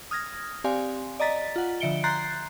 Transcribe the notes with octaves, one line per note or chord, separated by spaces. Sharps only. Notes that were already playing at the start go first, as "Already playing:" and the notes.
D#6 F6 G#6 A#6
C4 G4 D5 F5 G#5 C6
D5 D#5 A#5 A6 B6
F4 F#5
D3 F3 E5 C#7 D7 G7
A#5 C6 F#6 G6 A6 C7